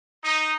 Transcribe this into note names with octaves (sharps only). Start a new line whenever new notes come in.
D#4